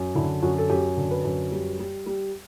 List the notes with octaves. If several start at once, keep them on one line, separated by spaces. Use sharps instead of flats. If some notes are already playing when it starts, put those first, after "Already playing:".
Already playing: F#2
D3 E4
F#2 F#4
A4
F#2 G4
D3
B4
F#2
G3
G3
G3